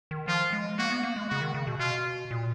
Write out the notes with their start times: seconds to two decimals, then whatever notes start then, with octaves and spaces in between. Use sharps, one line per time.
0.11 D#3
0.28 F3 F4
0.53 G#3
0.78 A#3 F#4
0.91 B3
1.03 A#3
1.16 G#3
1.29 C#3 F#4
1.41 D#3
1.54 C#3
1.67 B2
1.79 B2 F4
2.31 A#2